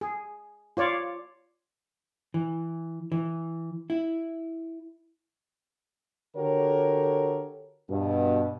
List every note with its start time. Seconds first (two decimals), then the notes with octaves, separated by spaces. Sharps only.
0.01 G#4
0.77 F4 C#5 D5
2.34 E3
3.12 E3
3.90 E4
6.36 D3 F#4 G4 A4 A#4 C#5
7.89 G2 B2